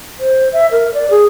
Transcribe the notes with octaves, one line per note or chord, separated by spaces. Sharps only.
C5
E5
A#4
D5
G#4